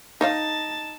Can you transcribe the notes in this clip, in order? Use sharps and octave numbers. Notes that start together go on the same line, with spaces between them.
D#4 C5 C#5 F5 A5